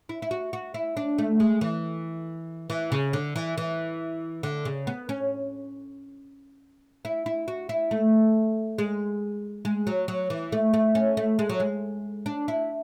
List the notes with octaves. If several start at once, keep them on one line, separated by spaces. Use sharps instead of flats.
E4
E4
F#4
F#4
E4
D4
A3
G#3
E3
E3
C#3
D3
E3
E3
D3
C#3
B3
C#4
E4
E4
F#4
E4
A3
G#3
G#3
F#3
F#3
E3
A3
A3
C#4
A3
G#3
F#3
G#3
D4
E4